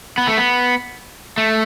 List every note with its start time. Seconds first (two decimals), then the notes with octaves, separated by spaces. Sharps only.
0.18 B3
0.27 A3
0.37 B3
1.38 A3